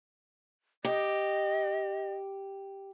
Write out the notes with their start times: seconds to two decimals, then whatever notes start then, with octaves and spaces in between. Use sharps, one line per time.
0.85 G4 D#5